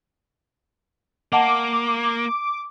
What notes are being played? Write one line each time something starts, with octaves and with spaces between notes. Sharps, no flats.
A#3 D#5 F#5 A5 D6